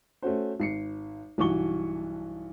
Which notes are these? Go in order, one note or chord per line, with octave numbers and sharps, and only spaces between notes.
A3 C#4 F#4 C5
G#1 C7 C#7
B1 G2 E3 F#4 C#6 G7